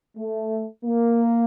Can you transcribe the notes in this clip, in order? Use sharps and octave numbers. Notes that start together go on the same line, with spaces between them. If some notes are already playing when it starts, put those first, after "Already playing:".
A3
A#3